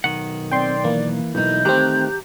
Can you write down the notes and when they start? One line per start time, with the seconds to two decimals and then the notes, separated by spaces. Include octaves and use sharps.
0.04 B1 D#3 F#5
0.51 C4 D5 G5 C6
0.84 E3 A#3
1.35 B1 D#4 E4 G6
1.65 D#3 A3 C4 G4 A#5 F#6